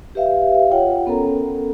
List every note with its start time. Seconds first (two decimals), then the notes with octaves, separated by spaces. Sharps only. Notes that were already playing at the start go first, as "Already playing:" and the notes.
0.15 G4 B4 E5 F5
0.72 F4 C#5 F#5 G5
1.07 B3 C#4 A4 A#4 A#5